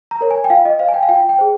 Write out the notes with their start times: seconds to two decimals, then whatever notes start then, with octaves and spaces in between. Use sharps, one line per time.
0.11 A#5
0.21 A#4 C#5
0.31 G#5
0.44 G5
0.50 F4 F5
0.65 D#5
0.79 C5 F5
0.89 G#5
0.94 G5
1.03 F5
1.09 F4 G5
1.29 G5
1.39 G#4 C5